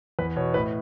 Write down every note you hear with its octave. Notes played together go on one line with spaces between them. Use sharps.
E2 B4
B2 C#5
A2 B4